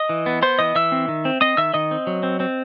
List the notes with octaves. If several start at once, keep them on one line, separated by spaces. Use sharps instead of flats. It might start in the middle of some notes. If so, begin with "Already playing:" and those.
Already playing: D#5 D#6
E3
B3
B3 C5 C6
E3 D#5 D#6
E3 E5 E6
C4
D#3
C4
C4 D#5 D#6
D#3 E5 E6
D#3 D#5 D#6
C4
F#3
C4
C4